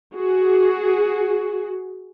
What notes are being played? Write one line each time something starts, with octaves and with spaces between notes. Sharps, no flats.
F#4 G#4